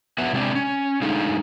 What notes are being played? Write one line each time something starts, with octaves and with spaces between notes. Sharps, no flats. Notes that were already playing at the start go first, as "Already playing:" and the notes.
F#3 B3 B4 E5 F#5
C3 G#3 C4 D4 D5
C#4
D3 G#3 A3 D#4 F5